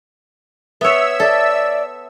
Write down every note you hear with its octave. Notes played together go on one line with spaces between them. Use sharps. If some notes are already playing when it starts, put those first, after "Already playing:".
B3 C#5 E5 E6
A4 D5